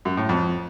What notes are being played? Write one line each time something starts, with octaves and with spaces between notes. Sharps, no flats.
F#2
A2
F2